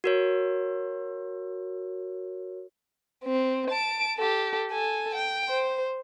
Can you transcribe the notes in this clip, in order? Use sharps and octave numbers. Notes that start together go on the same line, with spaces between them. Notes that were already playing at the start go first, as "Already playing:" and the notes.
F#4 A#4 C#5
C4
A5 D7
G4 A4
A4 G#5
G5
C5